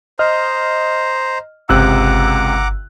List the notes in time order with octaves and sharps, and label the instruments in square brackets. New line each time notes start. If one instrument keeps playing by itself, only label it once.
[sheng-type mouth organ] C5 A#5 [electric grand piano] D#5 F6
[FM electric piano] G1 E6 [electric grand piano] C#2 C3 F#6 [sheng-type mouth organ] F#5 A#5 D6